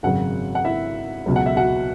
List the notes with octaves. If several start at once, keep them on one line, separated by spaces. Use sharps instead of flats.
G#1 F#2 C#3 F#3 F#4 F#5
F#5
E4 E5
C#2 B2 F#3
F#5
E5
F#4 F#5